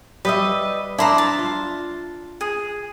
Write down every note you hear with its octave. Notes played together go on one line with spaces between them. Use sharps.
G3 B4 D#5 E5
D4 E4 C5 A#5
A5
F4
G#4